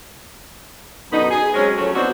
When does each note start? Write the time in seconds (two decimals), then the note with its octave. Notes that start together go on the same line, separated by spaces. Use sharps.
1.12 F#2 B2 D3 B3 D#4
1.31 G#4
1.54 F#3 G#3 C4 C#4
1.77 F3 F#3 A3 C#4
1.95 B3 C4 D4 D#4 F#4 C5